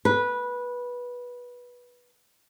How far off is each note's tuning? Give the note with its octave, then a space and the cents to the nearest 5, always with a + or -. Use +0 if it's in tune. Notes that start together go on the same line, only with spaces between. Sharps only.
B4 -15